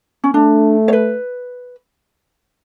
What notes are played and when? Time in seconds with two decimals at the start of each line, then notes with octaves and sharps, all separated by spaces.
0.24 C#4
0.34 A3 D4
0.88 C#5
0.93 B4